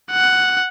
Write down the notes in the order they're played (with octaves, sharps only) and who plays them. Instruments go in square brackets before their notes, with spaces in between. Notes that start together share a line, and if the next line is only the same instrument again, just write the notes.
[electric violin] F#5